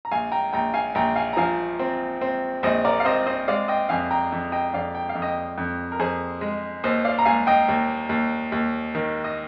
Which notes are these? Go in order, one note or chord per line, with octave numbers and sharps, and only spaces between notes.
A#5
A#1 F5 G#5
G5 A#5
A#1 G5 A#5
F5 G#5
A#1 G5 A#5
F5 G#5
A#5
F3 F5 G#5
C4
C4
A#1 C5 D#5
A#4 D5
F5
C4 C5 D#5
C5 D#5
G#3 D5 F5
D#5 G5
F2 F5 G#5
G5 A#5
F2
D#5 G5
F2 D5 F5
G5
F5
F2
D#5 G5
F2
A#4
F2 G#4 C5
G#3
D#2 C5 D#5
D5 F5
A#5
D#2 F5 G#5
D#5 G5
D#2
D#2
D#2
D#3
D#5